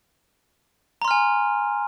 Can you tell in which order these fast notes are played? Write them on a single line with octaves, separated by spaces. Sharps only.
A#5 C6 F6 G#5